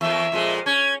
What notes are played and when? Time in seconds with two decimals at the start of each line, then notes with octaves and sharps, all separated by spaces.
0.01 E2 A#3 E5
0.32 F2 A#2 G#3
0.66 C#4 G#6